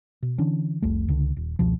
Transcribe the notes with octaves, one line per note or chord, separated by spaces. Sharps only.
B2
D3 E3 C#4 D4
F1 C2 A3
C#2 D3
D#1
F1 C#2 B2 F3